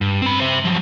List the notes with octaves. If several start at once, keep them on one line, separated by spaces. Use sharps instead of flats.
G2
C4 B5
C5 E5
F3 F#3